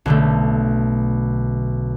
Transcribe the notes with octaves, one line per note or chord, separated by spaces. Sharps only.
B1 D3 A3